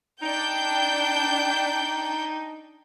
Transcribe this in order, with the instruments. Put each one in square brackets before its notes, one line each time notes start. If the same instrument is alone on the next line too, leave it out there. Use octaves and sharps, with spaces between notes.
[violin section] D4 G5 G6 [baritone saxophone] D#4